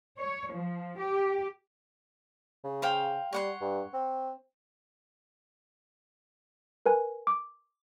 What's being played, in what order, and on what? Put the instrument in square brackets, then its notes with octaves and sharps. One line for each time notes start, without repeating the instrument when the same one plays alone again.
[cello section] C#5
F3
G4
[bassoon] C#3
[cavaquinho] C5 F5 G5
[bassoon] G3 [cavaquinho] C#5 F#5 C6
[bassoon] G2
C4
[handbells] A#4 B4 G#5
D6